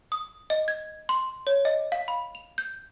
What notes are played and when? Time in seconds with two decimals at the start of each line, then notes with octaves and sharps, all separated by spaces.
0.12 D#6
0.50 D#5
0.68 G#6
1.09 C6
1.47 C#5
1.65 D#5
1.92 F5
2.08 B5
2.35 F7
2.58 G6